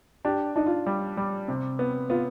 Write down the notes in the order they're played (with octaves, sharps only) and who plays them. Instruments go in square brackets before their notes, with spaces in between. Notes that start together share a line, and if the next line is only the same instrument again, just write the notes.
[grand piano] D4 [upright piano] G4
[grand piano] D4 [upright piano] D#4
[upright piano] F4
[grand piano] G3
G3
C3
B3
[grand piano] B3 [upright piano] F4